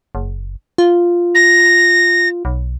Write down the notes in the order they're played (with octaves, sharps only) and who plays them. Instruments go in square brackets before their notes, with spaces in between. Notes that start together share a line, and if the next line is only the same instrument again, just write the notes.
[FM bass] F#1
F4
[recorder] A#6
[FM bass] B1